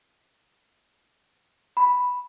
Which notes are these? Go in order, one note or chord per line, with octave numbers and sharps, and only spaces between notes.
B5